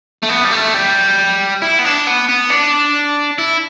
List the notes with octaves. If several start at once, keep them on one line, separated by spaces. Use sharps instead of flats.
A3
B3
G3
A3
G3
E4
B3
D4
B3
B3
D4
E4